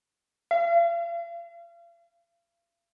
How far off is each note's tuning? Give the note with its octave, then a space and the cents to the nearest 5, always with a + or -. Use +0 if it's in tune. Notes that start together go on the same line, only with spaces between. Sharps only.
F5 -40